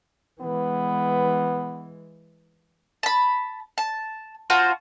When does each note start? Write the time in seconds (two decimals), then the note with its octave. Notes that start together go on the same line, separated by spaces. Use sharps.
0.41 E3 G#3 B3
3.03 A5 B5
3.78 A5
4.50 F4 F#4 C5 A5